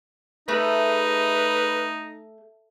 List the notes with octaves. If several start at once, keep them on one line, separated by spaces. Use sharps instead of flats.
A3 D#4 B4